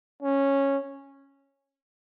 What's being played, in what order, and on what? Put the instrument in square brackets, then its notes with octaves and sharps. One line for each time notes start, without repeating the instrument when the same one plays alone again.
[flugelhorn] C#4